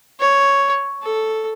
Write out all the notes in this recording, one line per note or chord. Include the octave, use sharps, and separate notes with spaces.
C#5
A4